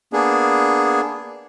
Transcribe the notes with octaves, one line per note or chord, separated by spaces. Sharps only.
A#3 B3 D4 G#4